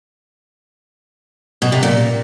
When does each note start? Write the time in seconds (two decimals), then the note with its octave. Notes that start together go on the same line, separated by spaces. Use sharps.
1.62 B2
1.72 C3
1.83 A#2